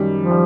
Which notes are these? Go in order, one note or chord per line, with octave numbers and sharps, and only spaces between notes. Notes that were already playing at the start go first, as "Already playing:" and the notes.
Already playing: F#2 D#3 G3
F3
G3